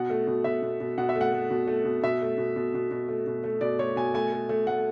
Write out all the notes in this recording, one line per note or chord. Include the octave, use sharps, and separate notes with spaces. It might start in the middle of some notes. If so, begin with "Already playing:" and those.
Already playing: B2 F#5
A3
B2
B2 E5
B2
B2
B2 F#5
E5
A3
F#5
A3
B2
A3
B2
B2 E5
A3
B2
B2
B2
B2
A3
B2
A3
B2 D5
A3 C#5
B2 G#5
A3 G#5
A3
A3
A3 F#5